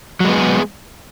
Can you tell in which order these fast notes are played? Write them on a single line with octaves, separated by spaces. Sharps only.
F#3 G#3 B3 G#4